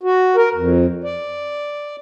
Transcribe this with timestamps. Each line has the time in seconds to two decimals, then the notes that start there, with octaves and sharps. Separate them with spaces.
0.03 F#4
0.36 A#4
0.55 F2
1.04 D5